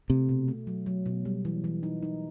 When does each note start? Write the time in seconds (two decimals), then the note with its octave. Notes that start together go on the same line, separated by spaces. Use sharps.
0.10 C3 A3
0.29 B2
0.48 A3
0.67 F#3
0.86 F#3
1.06 B2
1.25 G3
1.45 E3
1.64 E3
1.83 D#4
2.03 D#4